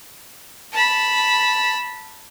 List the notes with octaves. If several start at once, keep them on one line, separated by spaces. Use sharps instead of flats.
A5 B5